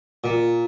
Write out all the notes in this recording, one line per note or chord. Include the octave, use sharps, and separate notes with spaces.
A#2